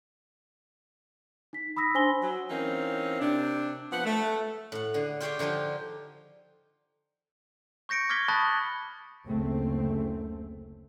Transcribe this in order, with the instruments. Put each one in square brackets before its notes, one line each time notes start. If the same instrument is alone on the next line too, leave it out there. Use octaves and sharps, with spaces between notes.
[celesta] D#4 B6
B5 D#6 E6 A#6 B6
D4 C5 G#5 C6 A#6 G7
[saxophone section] F#3
E3 A#3 C4 C#4 D#4
C3 D4
F3 B3 F#5
A3
[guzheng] A2 F#5
D3 G#4
F4 G4 G#4 C#5 D5 E5
D3 F3 D#4 F4 G4
[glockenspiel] C#6 G6 A#6 C#7 D7
D6 F6 G#6 B6 G7
A5 B5 C#6 D#6 F#6 A6
[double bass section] F#1 D2 C#3 A3 C4